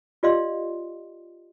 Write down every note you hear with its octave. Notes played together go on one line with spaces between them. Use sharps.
F4 G4 D5 D#5 F5 C6